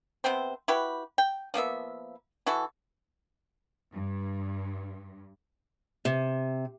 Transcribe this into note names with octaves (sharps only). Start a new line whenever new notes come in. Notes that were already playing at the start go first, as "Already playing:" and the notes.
C3 B3 C4 C5
E4 F#4 G4 B4
G5
F3 A#3 B3 E5
E3 E4 F#4 A4
G2
C3